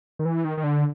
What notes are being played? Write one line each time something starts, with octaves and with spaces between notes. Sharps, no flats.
D#3
E3
D#3
D#3
D3